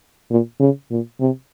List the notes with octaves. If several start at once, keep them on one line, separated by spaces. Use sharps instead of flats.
A#2
C#3
A#2
C3